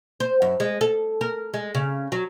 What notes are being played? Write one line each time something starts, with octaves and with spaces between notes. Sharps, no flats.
C5
F#2
G#3
A4
A#4
G#3
C#3
F#3